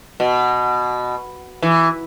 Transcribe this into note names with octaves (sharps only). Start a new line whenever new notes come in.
B2
E3